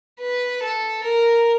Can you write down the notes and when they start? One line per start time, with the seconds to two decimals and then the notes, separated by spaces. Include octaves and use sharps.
0.21 B4
0.63 A4
1.04 A#4